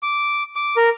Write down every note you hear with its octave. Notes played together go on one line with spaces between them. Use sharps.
D6
D6
A#4